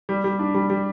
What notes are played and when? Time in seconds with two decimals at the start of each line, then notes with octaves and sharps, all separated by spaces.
0.09 G3
0.24 G3
0.39 D4
0.55 G3
0.70 G3